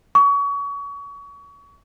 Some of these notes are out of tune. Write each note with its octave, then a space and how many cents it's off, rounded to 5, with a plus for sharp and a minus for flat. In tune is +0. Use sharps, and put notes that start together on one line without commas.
C#6 +30